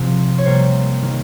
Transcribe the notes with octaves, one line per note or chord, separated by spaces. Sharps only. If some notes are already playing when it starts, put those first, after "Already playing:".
Already playing: C3 F3 G#3 C4
C#5
C3 G3 A#3 C5
D#3 A#3